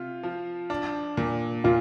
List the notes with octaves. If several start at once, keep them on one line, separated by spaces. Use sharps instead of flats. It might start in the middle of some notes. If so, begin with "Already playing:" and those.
Already playing: C3 F4
F3
D4
A#2
A#2 F4